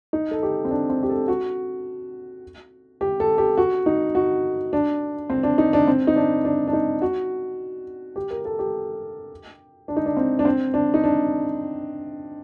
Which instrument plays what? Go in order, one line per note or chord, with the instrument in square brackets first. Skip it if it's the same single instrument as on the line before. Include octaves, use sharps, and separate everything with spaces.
[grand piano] D#4
A4
G4
C4
D4
C4
G4
A4
F#4
G4
A4
G4
F#4
D#4
F#4
D4
C4
D4
D#4
D4
C4
D#4
D4
D4
D4
D#4
F#4
G4
A#4
A4
G4
D4
D#4
D4
C4
D4
C4
D4
D#4
D4